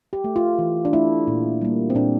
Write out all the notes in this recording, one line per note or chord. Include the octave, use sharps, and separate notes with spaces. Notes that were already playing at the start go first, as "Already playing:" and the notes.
G4
A3
F4
E3
D4
A3 E4
A#2
G3 A#3
C4
A#2 D4